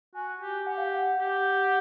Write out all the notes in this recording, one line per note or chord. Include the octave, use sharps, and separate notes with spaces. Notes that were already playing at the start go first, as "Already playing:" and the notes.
F#4 G#5
G4
G4 F#5
F5
F#5
G4